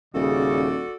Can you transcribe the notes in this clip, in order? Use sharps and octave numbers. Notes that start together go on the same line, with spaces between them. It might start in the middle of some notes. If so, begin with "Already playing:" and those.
D#1 C#3 F#4 A4 D5